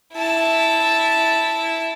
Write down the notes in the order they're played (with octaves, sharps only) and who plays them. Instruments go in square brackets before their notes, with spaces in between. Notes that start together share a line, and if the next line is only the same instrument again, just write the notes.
[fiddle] E4 A5